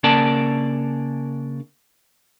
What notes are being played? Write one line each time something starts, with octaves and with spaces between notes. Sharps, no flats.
C#3 A#3 D4 A#4 D5 A5